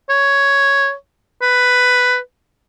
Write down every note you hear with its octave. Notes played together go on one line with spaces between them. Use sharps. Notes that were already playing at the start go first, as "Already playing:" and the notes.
C#5
B4